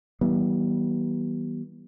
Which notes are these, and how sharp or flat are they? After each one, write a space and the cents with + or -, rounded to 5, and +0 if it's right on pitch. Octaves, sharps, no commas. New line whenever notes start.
E3 -35 G3 -40 B3 -40